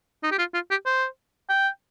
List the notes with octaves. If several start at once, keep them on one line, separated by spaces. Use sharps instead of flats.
D#4
G4
F4
F4
G4
C5
G5